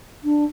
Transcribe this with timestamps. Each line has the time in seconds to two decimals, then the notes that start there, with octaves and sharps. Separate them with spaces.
0.24 D4